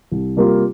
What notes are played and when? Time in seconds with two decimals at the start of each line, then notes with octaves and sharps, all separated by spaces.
0.12 C2
0.36 C3 G3 A#3 F4